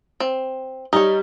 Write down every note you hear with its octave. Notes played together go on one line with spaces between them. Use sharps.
C4
G3 D#4 C#5